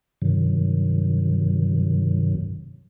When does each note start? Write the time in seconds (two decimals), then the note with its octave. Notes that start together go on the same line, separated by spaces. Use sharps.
0.22 G2 C3 D#3 F#3